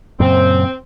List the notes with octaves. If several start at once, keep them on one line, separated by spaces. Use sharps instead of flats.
F#2 A#2 C#3 C4